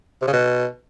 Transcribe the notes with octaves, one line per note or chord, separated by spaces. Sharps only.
C3
C#3
B2